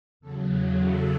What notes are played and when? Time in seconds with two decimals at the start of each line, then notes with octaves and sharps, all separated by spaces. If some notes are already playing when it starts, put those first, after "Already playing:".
0.20 E2 C#3 F#3 A4
0.81 A4